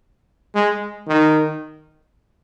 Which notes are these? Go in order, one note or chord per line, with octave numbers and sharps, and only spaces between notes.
G#3
D#3